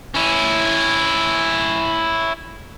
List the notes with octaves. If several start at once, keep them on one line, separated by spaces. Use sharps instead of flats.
C#4 E4